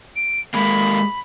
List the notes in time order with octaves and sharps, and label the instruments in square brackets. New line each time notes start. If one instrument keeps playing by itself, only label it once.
[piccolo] D7
[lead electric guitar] G#3 A#3 [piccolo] B5